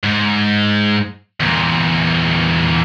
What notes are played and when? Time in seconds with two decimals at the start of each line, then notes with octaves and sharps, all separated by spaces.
0.04 G#2
1.40 E2 A#2